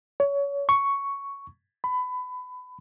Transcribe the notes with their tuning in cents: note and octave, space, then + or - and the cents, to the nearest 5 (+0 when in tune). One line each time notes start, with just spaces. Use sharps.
C#5 +25
C#6 +5
B5 +25